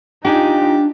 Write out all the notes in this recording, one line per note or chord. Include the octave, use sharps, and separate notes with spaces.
D4 D#4 F4 G4 G#5